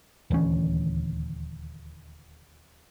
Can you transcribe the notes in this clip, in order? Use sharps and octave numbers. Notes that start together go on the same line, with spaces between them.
D#1 D2 E3 C#4